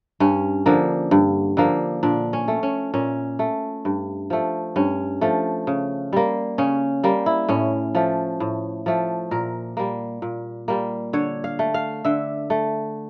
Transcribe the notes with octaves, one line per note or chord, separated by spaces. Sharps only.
G2 C#4
D3 F3 A#3
G2
D3 F3 A#3
A#2 D4
C#4
A3
C#4
A#2 C#4
A3
G2
F3 A3
G2 C#4
F3 A3
C#3
G3 A#3
C#3 C#4
G3 A#3
E4
A2 C#4
F3 A3
A2
F3 A3
A#2 A#4
G3 A#3
A#2
G3 A#3
D3 C#5
F5
A3
F5
D3 E5
A3